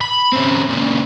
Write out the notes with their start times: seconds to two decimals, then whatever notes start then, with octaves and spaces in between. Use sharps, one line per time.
0.01 B5
0.33 C#3 C4
0.69 A#2 C#3